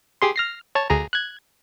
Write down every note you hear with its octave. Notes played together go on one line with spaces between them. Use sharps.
G4 G#4 C6
F6 A#6 C7
C#5 A5
D2 G#4 A#5
F#6 G#6